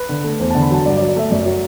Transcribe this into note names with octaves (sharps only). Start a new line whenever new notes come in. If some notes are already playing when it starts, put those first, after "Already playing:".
Already playing: B4
D3
A3
E2 C5
A5
D3
B5
F#3 A5
G2 D5
D5
F#3
D5
A3 E5
F#2 D5
F#3